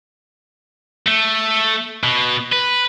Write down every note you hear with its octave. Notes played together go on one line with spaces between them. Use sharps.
A3
B2
B4